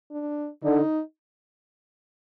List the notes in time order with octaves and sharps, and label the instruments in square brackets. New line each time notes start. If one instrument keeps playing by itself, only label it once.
[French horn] D4
[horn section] D3 [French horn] D#4